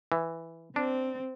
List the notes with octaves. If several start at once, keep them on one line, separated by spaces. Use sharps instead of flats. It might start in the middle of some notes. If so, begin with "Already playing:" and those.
E3
C4 D4